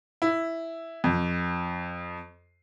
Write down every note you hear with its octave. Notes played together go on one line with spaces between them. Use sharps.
E4
F2